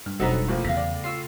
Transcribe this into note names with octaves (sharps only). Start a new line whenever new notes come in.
G2 F6
E1 F#3 B3 C4 D#4 F#4 A4
A2 F3 A#3
E2 A2 C#3 F5 A#6
D5
F4 C#6 E6 C7